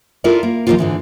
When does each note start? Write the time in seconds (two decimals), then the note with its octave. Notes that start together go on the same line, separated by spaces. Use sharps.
0.24 E4 F4 A4 A#4 D5
0.43 A#3
0.67 D#3 F3 F#3 A3 A#3 F4
0.79 G#2 D3 E3